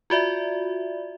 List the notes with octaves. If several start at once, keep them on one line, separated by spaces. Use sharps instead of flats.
F4 F#4 D5 E5